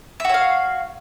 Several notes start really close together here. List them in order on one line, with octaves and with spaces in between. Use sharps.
E5 F#4 C#5 F5